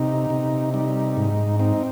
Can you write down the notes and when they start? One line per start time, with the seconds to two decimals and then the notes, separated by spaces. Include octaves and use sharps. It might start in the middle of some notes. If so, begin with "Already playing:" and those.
Already playing: C3 D#4
0.30 C3
0.74 G3 D#4
1.17 G#2
1.60 C4 D#4